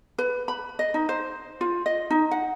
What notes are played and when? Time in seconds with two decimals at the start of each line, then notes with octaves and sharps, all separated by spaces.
0.18 B4
0.48 B5
0.79 D#5
0.94 D#4
1.09 C5
1.61 F4
1.86 D#5
2.10 D#4
2.31 F#5